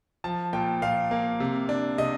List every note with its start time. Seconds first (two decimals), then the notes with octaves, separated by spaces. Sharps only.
0.24 F3 A5
0.53 A#2 G5
0.82 A#2 F5
1.11 A#3
1.40 C3
1.69 D4
1.98 C3 D#5